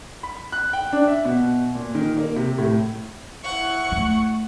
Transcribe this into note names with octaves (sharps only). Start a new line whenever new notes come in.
B5
F#6
G5
D4
E5
B2
A#2
D#3
A#3
C3
A2
E4 F#5 C#6
A3